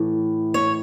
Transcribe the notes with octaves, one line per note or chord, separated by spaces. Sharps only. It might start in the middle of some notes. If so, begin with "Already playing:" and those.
Already playing: A2 E3
C#5